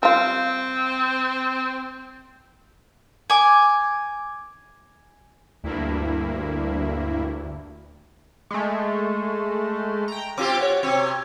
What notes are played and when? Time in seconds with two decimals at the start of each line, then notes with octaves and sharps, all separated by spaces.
0.03 G3 C4 F4
3.30 G#5 D6
5.64 D2 G2 A#3 E4
8.51 G#3 A3
10.08 G5 A#5
10.38 C4 F4 G4 D6
10.58 F#4 C#5
10.83 C3 C4 C#5